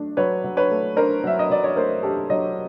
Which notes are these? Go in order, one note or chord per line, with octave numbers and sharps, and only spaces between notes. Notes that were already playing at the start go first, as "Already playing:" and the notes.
Already playing: F#3 A3 D4
F#3 B4 C#5
F#3
B4 C#5
A3
D4 A#4 C5
F#3 E5
D#5
F#3 D5
C#5
A3 A#4 C5
D4 G4 A4
F#3 C#5 D#5